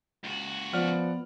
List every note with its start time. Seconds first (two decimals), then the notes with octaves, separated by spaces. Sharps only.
0.24 C#2 F#4
0.73 F3 B3 D5 F#5 F6